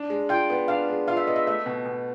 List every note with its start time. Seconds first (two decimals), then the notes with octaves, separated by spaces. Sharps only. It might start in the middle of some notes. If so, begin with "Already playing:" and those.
Already playing: D4
0.10 G#3
0.29 F4 G5
0.50 B3
0.68 D4 F5
0.88 G#3
1.08 F4 F5
1.17 E5
1.27 B3 D#5
1.36 E5
1.46 A3 E5
1.66 B2
1.85 B2